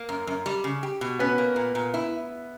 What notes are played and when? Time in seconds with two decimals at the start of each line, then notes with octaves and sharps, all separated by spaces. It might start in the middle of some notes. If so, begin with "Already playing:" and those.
Already playing: A#3
0.09 F#2
0.27 F#2
0.46 G3
0.64 C#3
0.83 G4
1.01 B2
1.19 B3 C#4 B4
1.38 A#3
1.56 A#2
1.75 A#2
1.94 E4